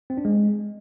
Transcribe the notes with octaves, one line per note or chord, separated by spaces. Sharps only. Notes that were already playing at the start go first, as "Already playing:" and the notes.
C4
D4
G#3